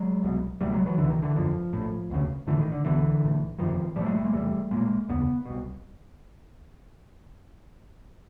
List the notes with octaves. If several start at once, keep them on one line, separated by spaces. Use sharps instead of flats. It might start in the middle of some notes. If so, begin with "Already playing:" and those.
Already playing: F#3 G#3
C2 B2
C#2 B2 G3 A3
F#3 G#3
E3 F#3
C#2 B2 D3 E3
D#3
D3 E3
G1 F2 D3 F3
A#1 A2
E1 D2 C#3
A#1 A2 D3 E3
D#3
D3
C2 B2 D3 E3
B1 A2
G1 F2 C3 D#3 F3
B1 A2 F3 G3 A3
F#3 G#3
G3 A3
G#3 A#3
E1 E2 C3 G3 A3
B1 A#2 G#3 A#3
F1 D#2 C#3 B3
C2 B2